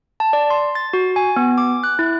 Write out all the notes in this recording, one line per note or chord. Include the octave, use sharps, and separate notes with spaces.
A5
D5
C6
A6
F#4
G#5
B3
D6
F#6
E4